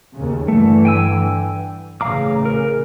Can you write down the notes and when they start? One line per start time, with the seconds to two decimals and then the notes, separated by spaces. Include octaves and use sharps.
0.15 D#2 C#3
0.48 G2 D3 E3 A3
0.85 G5 G#5 E6
2.01 A1 C#3 F5 A#5 D6
2.45 A#4